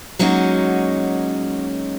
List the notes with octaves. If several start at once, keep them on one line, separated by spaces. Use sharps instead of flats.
F#3 G#3 A#3 C#4 D#4 F#4